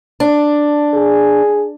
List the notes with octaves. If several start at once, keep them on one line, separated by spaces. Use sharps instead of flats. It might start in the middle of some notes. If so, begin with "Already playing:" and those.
D4
G#4